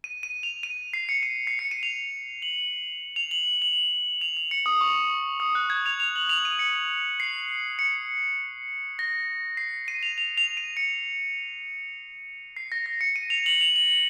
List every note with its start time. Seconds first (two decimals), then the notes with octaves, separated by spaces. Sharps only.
0.04 D#7
0.23 D#7
0.43 F7
0.63 D#7
0.94 C7
1.09 C#7
1.23 D#7
1.47 C7
1.59 C#7
1.71 D#7
1.83 F7
2.42 F#7
3.16 F7
3.31 F#7
3.62 F#7
4.21 F7
4.37 F7
4.51 C#7
4.66 D#6
4.81 C#6
5.40 D#6
5.55 F#6
5.70 G#6
5.86 F7
6.00 F7
6.16 F#7
6.29 F7
6.45 D#7
6.59 C#7
7.20 C7
7.79 C#7
8.99 A#6
9.57 C7
9.88 D#7
10.03 F7
10.18 F7
10.38 F7
10.57 D#7
10.77 C#7
12.57 C7
12.72 A#6
12.86 A#6
13.01 C#7
13.16 D#7
13.30 F7
13.46 F#7
13.61 F7
13.76 F#7